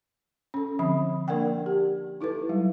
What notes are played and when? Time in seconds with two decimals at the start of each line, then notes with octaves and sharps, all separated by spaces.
0.54 C#4 A4
0.79 D3 F3 C4 B5
1.28 A#3 D4 A#4 D5 F#5 G5
1.66 G4
2.21 D#4 E4 A4 B4
2.49 F#3 G3 D#4